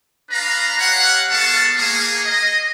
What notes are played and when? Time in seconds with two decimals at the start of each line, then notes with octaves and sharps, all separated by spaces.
0.30 D4 B4 F5 A#5
0.79 G4 C#5 F5 F#5
1.30 G#3 B3 A4 F5 A5 C#6
1.77 A#3 G#4
2.24 D#5